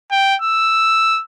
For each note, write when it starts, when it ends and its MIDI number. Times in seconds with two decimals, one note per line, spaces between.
0.11 0.36 79
0.42 1.22 88